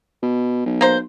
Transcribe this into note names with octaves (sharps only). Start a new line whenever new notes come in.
B2
B1
A#3 C5